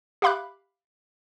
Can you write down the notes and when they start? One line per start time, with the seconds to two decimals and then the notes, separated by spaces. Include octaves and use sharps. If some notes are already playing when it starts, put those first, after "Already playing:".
0.22 G4 E5 F5 B5 D6 F#6